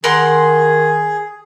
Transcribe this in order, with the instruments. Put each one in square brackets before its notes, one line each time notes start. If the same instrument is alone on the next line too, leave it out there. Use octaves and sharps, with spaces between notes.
[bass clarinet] D#3 [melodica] G#4 [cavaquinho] A#4 F#5 C6